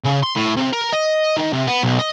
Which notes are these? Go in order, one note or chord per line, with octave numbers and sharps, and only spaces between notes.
C#3
C6
A2
C3
A#4
D#5
D#3
C3
B3
B1
D#5